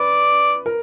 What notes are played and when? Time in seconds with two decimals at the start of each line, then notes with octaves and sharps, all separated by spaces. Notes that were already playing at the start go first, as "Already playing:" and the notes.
Already playing: B4 D5
0.66 A#4